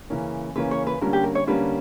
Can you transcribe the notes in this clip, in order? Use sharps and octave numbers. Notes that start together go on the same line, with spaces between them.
C#3 E3 A#3 C#4
C#3 E3 A#3 C#4 B4
C#5
B4
D3 G3 A#3 C#4 A#4
G4
A#4
C#5
D3 G3 A#3 C#4 B4